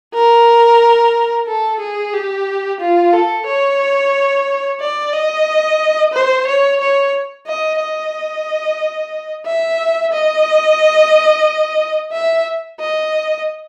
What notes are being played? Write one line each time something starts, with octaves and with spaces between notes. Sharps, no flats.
A#4
A4
G#4
G4
F4
A4
C#5
D5
D#5
C5
C#5
C#5
D#5
D#5
E5
D#5
E5
D#5